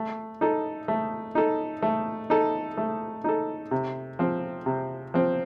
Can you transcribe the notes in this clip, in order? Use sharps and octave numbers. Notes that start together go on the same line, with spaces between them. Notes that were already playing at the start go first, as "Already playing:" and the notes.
Already playing: A3
D#4 A4
A3
D#4 A4
A3
D#4 A4
A3
D#4 A4
C3
F3 C4
C3
F3 C4